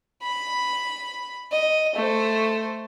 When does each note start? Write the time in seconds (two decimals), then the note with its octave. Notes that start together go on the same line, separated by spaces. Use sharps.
0.23 B5
1.51 D#5
1.95 A3 C5